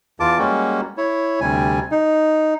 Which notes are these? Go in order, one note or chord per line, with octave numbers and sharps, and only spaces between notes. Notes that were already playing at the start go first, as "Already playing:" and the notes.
E2 E3 F4 A5 D6
G3 G#3 A#3 C#4 F#4
E4 C#5
D2 C3 G3 G#5
D#4